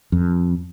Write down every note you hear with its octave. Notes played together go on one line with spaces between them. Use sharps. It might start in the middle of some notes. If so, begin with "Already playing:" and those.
F2